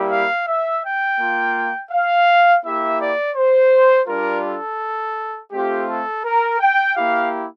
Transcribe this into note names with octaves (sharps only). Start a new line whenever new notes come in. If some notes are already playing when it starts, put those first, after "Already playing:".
Already playing: G3 A#3 E4 G4
F5
E5
G5
A#3 F4
F5
A#3 E4 G4 E5
D5
C5
G3 D4 F4 A#4
A4
A3 C4 F4 G4
A4
A#4
G5
A#3 E4 G4 F5